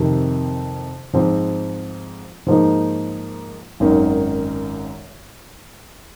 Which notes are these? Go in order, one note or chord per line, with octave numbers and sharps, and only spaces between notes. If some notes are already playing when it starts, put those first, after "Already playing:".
Already playing: F2 C3 D#3
G#2 F3 C4
G#2 F3 A#3 D#4
G#1 F#2 D#3